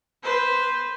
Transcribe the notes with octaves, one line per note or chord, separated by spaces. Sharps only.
B4 C5